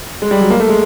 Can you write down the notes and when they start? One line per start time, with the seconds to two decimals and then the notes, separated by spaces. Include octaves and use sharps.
0.22 G#3
0.31 G3
0.41 F#3
0.50 A#3
0.60 A3
0.69 G#3